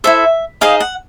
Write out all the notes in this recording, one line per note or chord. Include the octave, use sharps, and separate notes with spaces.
E4 A4 C5 E5
D#4 G#4 C5 D#5 F5
F#5